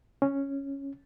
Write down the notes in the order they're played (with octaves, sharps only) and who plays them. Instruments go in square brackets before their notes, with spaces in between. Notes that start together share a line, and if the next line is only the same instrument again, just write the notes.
[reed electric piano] C#4